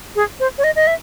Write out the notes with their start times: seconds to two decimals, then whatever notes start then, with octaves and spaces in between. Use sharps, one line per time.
0.16 G#4
0.40 C5
0.58 C#5
0.64 D#5
0.76 D#5
0.87 E5